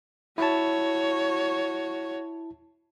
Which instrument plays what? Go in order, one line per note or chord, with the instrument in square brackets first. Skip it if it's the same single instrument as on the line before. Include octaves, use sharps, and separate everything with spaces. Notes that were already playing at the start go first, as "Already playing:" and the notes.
[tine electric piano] E4 A5 [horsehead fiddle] F#4 C#5